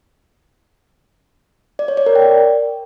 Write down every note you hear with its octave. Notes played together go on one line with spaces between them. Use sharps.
D5
C#5
D5
A#4
G5